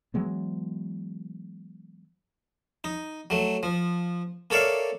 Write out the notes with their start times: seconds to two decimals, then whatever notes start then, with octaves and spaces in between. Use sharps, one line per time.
0.14 E3 F#3 G#3 B3
2.84 D#4
3.30 F#3 A3
3.63 F3
4.50 A#3 A4 C#5 D5 E5 F5